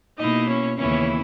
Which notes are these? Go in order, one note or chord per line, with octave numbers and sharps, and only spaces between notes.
B2 A#3 D#4 E4 D#5
C#4 C#5
D#2 C#3 E3 B3 C#4 E4 C#5